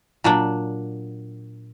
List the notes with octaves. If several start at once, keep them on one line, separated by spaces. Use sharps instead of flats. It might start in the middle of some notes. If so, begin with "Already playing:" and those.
A#2 F#3 D4